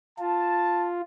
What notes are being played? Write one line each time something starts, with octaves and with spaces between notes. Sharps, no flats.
F4 A5